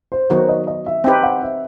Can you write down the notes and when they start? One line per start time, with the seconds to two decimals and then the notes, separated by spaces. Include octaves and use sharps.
0.12 C5
0.30 D#3 F#3 B3 D#4 F#4 C5
0.49 D#5
0.67 D#5
0.86 E5
1.04 C4 D#4 G4 B4 G5
1.23 F#5
1.42 E5